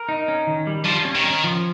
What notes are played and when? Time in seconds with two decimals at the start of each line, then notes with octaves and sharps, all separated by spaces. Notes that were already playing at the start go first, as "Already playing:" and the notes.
Already playing: A#4
0.09 D#4
0.28 C#4
0.47 D#3
0.67 G3
0.85 F3 G3
1.05 C#4
1.15 D#3
1.24 C#4
1.44 F3